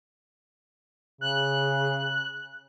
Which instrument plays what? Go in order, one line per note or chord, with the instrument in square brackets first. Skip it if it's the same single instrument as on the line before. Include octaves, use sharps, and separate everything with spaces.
[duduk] C#3 [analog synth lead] F#6